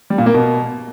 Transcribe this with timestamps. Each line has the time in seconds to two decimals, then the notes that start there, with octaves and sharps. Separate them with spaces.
0.10 G3
0.18 A#2
0.26 A#3
0.34 B2